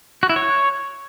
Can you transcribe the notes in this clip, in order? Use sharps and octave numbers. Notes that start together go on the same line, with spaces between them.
F#4
E4
C#5